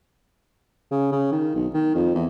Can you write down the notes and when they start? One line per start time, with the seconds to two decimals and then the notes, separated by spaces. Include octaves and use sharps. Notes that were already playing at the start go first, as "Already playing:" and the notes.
0.91 C#3
1.12 C#3
1.32 D#3
1.55 B1
1.74 D#3
1.95 F2
2.15 E2